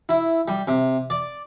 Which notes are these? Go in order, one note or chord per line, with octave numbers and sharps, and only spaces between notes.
E4
G3
C3
D5